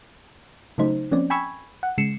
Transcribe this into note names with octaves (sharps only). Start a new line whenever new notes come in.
C#3 F#3 A3 D#4 C5
F3 A#3 C4 C#4 D5
G5 G#5 B5 C#6 E6 G#6
F#5
C#3 G#3 C7 C#7 E7